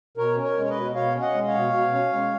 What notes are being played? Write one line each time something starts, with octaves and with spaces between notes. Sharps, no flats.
B2 A#4 C#5
C#4
A#4 C#5
G#3
C#5
B4 D#5
B2
B2 C#5 F5
C#4
D#5 F#5
G#3
C#5 F5
B2
B2
C#4
G#3